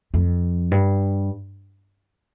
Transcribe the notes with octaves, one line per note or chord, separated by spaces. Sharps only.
F2
G2